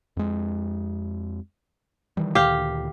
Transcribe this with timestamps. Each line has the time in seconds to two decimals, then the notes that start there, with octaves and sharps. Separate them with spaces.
0.17 F2 G#3
2.17 D#3 E3 G3
2.35 D2 A#2 D#3 G4 F5